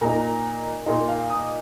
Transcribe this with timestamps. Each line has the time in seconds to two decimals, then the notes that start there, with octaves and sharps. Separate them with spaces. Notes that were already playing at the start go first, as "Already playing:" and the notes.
0.01 A#2 A#3 D#4 A#5
0.86 A#2 A#3 D#4 C6
1.08 F5
1.30 D#6